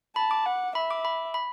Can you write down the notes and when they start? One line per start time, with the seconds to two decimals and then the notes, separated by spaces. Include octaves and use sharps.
0.16 A5 B5
0.31 D6
0.46 F#5
0.75 E5 B5
0.91 D6
1.05 B5
1.34 B5